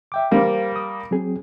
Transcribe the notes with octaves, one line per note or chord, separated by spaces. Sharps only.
E5 G5 D6
G3 A#3 C5 F5
D#6
F#3 C4 G#4